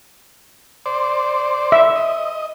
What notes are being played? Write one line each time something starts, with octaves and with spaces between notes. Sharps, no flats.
C5 D5
E5
D#5